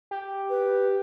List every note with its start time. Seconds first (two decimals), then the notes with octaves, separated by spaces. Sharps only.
0.11 G4
0.49 B4